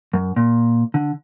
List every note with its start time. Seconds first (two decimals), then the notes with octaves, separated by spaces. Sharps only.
0.13 F#2
0.36 A#2
0.94 D3